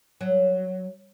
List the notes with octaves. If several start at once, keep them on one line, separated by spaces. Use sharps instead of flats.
F#3